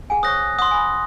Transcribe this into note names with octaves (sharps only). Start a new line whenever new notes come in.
G#4 F#5 G#5
C5 C#5 C#6 D#6 F#6 A#6
F#5 C6 D#6
G#5 B5